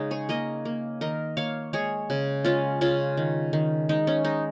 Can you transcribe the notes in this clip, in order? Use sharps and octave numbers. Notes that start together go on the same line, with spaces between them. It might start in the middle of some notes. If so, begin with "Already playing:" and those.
Already playing: C#3 G#3 C#4 D#4
G#4 C#5
A#3 A#4 D#5
A#3
D#3 A#4 D#5
A#3 C#5 F5
G#3 G#4 C#5
C#3
G#3 C#4 F4
C#3 C#4 F4
D#3
D#3
G#3 D#4
C#4
G#3 D#4